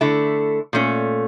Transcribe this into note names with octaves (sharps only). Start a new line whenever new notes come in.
D3 A3 E4
A#2 A3 C#4